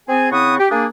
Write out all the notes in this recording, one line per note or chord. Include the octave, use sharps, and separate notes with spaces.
C4 G#4 G#5
C#3 C4 E4 F#5 C#6 D#6
G4
A#3 D4 G#4